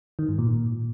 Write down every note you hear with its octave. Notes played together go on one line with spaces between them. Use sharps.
D#3
G#2
A#2